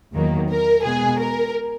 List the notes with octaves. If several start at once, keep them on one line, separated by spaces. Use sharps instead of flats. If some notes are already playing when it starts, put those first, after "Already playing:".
E2 D#3 F#3 A#3
A#4
B2 G#3 B3 G#4
A#4